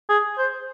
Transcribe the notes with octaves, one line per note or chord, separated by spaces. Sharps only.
G#4
C5